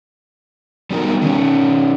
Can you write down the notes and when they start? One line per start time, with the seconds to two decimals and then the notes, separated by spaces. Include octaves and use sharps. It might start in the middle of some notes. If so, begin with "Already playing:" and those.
0.90 G3 B3 D#4 F#4 A#4
1.21 D#3 C#4